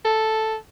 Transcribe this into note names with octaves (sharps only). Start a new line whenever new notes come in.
A4